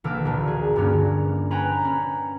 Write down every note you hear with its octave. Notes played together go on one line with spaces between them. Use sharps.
A#1 D3 E3 A#3 D6 E6
D2 A#2
G#4
G2 D3 A#3 C#4
B4 C#5 G5 G#5 A#5 B5
C#4